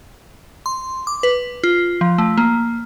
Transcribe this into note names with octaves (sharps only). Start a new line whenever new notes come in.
C6
D6
B4
F4
F3
A3
A#3